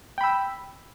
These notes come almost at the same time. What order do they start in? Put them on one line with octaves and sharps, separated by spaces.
G5 B5 E6